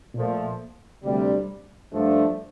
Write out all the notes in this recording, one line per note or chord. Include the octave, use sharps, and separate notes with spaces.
A#2 F3 A3
D2 C3 G3
G2 F3 A3 D4